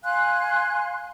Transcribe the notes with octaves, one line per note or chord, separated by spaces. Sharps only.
F5 G#5 C6 F#6